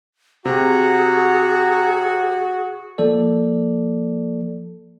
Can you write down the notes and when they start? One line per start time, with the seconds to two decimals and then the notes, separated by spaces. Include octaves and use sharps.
0.45 C3 F#4 G#4 F#5 A#5
2.98 F3 A#3 A4 D5